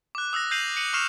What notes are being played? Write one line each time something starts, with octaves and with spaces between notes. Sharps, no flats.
D6 F#6
D#6 E6 F#6 A#6
G6 A#6 C7 D#7 F7 F#7
C#7 D#7 F#7
C#6 F6 C7 E7 F7